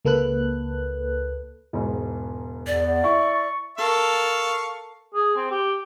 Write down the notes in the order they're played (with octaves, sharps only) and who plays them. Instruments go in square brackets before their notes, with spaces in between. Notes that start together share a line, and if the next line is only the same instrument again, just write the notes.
[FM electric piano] C#2 A#3 A4 B4 F#6
[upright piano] E1 G#2
[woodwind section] E2 [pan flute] D5
[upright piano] E4 [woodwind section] C#6
[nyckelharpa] A4 A#4 [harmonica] F5 C#6
[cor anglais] G#4
C4
G4